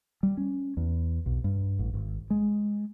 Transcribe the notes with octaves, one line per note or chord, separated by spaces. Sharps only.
G3
C#4
E2
B1
G2
A1
G#1
G#3